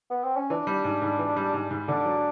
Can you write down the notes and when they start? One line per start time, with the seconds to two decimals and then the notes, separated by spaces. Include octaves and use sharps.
0.10 B3
0.24 C4
0.37 C#4
0.50 E3 D4
0.67 G3
0.85 G#2
1.02 G#2
1.19 E3
1.36 G3
1.54 G#2
1.71 G#2
1.88 D3 D4
2.05 F#3